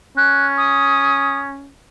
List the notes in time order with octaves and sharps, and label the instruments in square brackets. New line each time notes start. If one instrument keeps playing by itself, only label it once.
[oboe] C#4 [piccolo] F#6
[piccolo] D#6